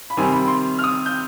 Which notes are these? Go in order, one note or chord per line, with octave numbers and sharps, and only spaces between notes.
B5
C3 D#3 G3 C4 G#5
B5
C6
F6
D#6
G6